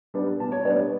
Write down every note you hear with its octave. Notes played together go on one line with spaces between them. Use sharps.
G3 B3 D4
B2 A5
C#5
G3 B3 D4 D5